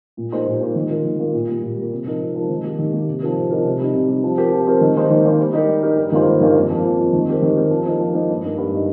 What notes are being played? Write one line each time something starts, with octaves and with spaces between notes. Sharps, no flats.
A#2
A#3 D#4 G4 C5
A#2
A#3 D#4 G4 C5
D#3
A#3 F4 A#4
D#3
A#3 F4 A#4
A#2
G3 A#3
A#2
G3 A#3
C3
F3 D#4 A#4
C3
F3 D#4 A#4
D#3
A#3 G4
D#3
A#3 G4
C3
F3 D#4 G4 A#4
C3
F3 D#4 G4 A#4
C3
G3 D#4
C3
G3 D#4
F3
C4 G4 A#4
F3
C4 G4 A#4
D#3
A#3 D#4 C5
D#3
A#3 D#4 C5
G3
D#4 G4 A#4
G3
D#4 G4 A#4
G2
D#3 A#3 F4 C5
G2
D#3 A#3 F4 C5
F2
F3 A#3
F2
F3 A#3
D#3
C4 G4 A#4
D#3
C4 G4 A#4
F3
A#3 D#4 A#4
F3
A#3 D#4 A#4
G2
G3 A#3 D#4
G2
G3 A#3 D#4